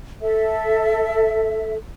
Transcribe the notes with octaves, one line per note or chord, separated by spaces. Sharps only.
A4 E5